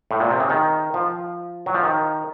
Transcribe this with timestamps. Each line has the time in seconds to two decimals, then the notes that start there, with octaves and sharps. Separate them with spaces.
0.11 A2
0.20 A#2
0.30 C3
0.40 C#3
0.50 D#3
0.94 F3
1.66 F#3
1.74 F3
1.84 D#3